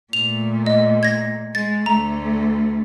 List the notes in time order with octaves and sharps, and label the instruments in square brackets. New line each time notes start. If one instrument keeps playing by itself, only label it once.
[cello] A#2 A3 [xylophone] F7
[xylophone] D#5
G#6 A#6
[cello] G#3 [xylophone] A6
[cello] D2 A3 [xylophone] A#5